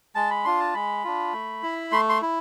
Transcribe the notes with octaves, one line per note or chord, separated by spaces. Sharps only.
G#3 A5
B5
D4 F4 C6
A5
G#3 B5
D4 F4
A3
E4
A3 C6
C6
E4